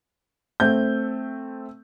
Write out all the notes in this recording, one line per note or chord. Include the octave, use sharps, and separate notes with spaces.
A3 C4 G6